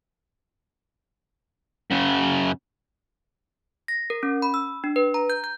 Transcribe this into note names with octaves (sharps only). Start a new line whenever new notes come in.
F#2 C#3
A#6
A#4
C#4
B5
E6
D4
B4
A#5
G6
G6